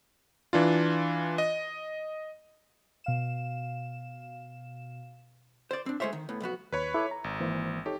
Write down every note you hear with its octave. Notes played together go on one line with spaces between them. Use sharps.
E3 D4 F4
D#5
B2 F5 E7
C5 D5
C4 D4
G#3 A3 C5 C#5 E5
D#3
A2 B3
B1 F2 B3 F#4
D#2 B4 C#5 B5
E4 A4 D6
A#5
G#1
E3 A#3 C5
D#4 G4 A4 C#5